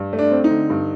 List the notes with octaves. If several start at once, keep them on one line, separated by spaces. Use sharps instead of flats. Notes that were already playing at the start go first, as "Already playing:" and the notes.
Already playing: G2
A3
D4
C4
D#4
D3
G2